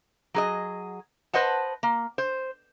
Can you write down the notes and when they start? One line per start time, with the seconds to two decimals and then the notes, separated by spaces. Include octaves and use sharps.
0.34 F#3 G#4 D#5
1.33 B4 C5 D#5 F#5 A5
1.83 A#3
2.18 C5